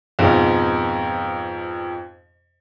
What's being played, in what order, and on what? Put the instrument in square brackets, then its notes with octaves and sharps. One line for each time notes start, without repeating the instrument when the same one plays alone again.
[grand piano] F2 G#2 B2